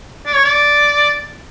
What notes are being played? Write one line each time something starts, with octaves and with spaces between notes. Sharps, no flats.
D5
C#5
D5